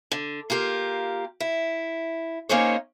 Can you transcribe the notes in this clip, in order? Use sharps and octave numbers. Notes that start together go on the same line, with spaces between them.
D3
A#3 F4 G4 A#4
E4
A#3 C#4 D#4 G#4 C5 C#5